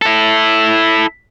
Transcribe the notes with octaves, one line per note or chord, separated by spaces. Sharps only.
E4 A4